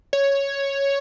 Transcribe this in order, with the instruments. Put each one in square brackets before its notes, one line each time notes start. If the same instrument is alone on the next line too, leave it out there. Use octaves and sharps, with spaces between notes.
[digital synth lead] C#5